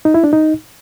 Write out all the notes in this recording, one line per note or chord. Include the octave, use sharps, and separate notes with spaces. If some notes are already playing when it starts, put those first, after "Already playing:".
D#4
E4
D4
D#4